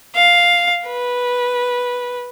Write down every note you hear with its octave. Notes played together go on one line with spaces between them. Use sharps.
F5
B4